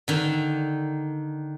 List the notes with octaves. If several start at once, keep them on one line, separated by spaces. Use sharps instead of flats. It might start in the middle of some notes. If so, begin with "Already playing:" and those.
D3 D#3